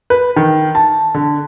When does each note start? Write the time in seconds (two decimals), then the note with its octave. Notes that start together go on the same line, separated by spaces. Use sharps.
0.10 B4
0.36 D#3
0.75 A5
1.15 D3